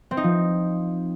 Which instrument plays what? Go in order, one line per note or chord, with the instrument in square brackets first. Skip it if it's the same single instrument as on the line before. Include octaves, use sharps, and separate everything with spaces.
[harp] C4
D#4
F3